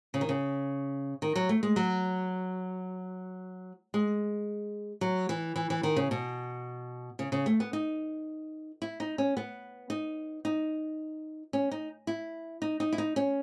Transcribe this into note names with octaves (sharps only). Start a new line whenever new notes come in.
C#3
D#3
C#3
D#3
F#3
A3
G#3
F#3
G#3
F#3
E3
E3
E3
D#3
C#3
B2
C#3
C#3
A3
B3
D#4
E4
D#4
C#4
B3
D#4
D#4
C#4
D#4
E4
D#4
D#4
E4
D#4
C#4